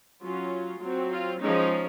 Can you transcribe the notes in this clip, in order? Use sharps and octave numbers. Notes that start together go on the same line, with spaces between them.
F#3 C#4 F4
F#3 C4
F4
F3 G#3 C#4 D#4